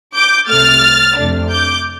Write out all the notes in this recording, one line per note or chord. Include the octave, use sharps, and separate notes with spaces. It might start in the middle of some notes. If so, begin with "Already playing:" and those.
D6 G6
C2 C3 A3 F6 A6
F2 C3 A3 D4
D6 G6